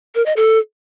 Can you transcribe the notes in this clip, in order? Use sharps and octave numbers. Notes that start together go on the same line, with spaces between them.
A#4
D#5
A4